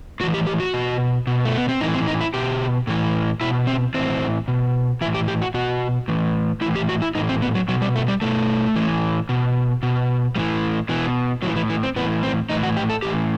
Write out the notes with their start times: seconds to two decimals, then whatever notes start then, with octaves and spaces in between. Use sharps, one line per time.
0.20 A2 E3 F#4
0.34 G4
0.47 G4
0.60 F#4
0.74 B2
1.27 B2
1.45 A3
1.57 B3
1.69 C4
1.81 A2 E3 D#4
1.94 C4
2.07 D#4
2.21 E4
2.34 B2 G4
2.87 A2 E3
3.41 B2 E4
3.67 C4
3.94 A2 E3 C4
4.48 B2
5.01 E3 E4
5.05 A2
5.15 G4
5.28 G4
5.42 F#4
5.54 B2 F#4
6.08 A2 E3
6.61 A2 E4
6.65 E3
6.76 G4
6.89 F#4
7.02 E4
7.15 A2 E3 D#4
7.29 C4
7.42 B3
7.55 F#3
7.68 B2 F#3
7.82 G3
7.96 A3
8.08 G3
8.22 B2 A3
8.76 A2 E3
9.29 B2
9.83 B2
10.36 A2 E3 G3
10.89 B2 E3
11.42 A2 F#3
11.46 E3
11.56 E3
11.70 E3
11.83 C4
11.96 A2 E3 B3
12.23 C4
12.50 A2 E3 D#4
12.63 F#4
12.77 G4
12.89 A4
13.02 A2 E3 G4